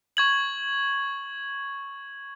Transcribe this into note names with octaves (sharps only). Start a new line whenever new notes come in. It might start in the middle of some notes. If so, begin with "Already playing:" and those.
C#6 G#6 F#7